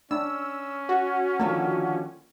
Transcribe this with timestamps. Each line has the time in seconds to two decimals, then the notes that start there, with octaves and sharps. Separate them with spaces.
0.11 C#4 D4 E6
0.89 F#4
1.40 D3 D#3 F3 A#3